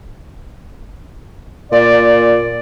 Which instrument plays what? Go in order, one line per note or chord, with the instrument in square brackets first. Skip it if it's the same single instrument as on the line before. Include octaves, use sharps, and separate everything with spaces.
[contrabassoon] A#2 [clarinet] D5